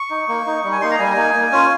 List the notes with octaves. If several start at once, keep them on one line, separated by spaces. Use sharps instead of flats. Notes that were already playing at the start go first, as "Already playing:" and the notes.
Already playing: C#6
D#4
A#3
D#4
G3
G#5
A#3 D#4 C6
A#5
G3 G#5
A#3 D#4
A#3
C#4 F4